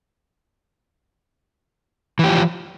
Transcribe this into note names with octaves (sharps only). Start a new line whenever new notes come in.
E3 F3 G4